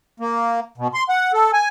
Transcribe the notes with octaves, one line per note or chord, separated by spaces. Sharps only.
A#3
B2
C6
F#5
A4
G#5